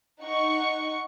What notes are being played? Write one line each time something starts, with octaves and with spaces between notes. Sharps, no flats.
D#4 F#5 C#6